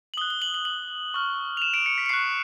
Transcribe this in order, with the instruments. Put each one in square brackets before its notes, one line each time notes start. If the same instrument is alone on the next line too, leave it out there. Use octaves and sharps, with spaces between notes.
[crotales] F#7
D#6 G7
F#6
G7
F#7
F#7
F#7
C#6 F6
F7
E7
D7
C#7
B6
C#7
C#6 F#6 C7